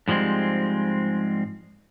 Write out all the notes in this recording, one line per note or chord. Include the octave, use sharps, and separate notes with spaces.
G#2 F3 G3 G#3 C4